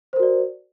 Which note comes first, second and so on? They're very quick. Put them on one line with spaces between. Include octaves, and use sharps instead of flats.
C5 A#4 F#4 D5